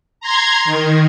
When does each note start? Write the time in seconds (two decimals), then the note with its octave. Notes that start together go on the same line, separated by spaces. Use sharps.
0.21 A#5 C6 G#6
0.65 D#3